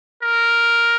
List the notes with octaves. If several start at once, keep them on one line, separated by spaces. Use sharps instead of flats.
A#4